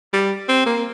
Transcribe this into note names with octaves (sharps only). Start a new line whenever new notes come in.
G3
C4
A#3